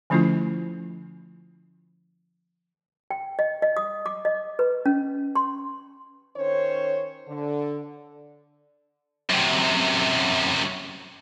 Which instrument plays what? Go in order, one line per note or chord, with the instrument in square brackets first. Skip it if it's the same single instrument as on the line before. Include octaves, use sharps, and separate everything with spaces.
[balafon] D3 F3 A3 C#4 E4 F4
[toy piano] G5
D#5
D#5
D#6
D6
D#5
B4
C#4
C6
[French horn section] D#3 C#4 C5 C#5
D3
[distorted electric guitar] F#2 C3